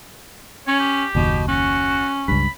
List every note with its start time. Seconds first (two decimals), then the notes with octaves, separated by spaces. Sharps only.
0.67 C#4 C#5
0.80 G4
1.15 F#1 D#2 B2
1.48 C#4 F#4
2.28 C#2 G2 B5